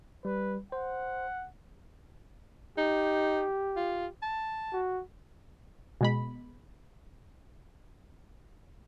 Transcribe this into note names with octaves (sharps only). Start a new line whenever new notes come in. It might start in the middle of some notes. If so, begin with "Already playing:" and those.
G3 B4
C5 F#5
D#4 G4
F4
A5
F#4
B2 G#3 B5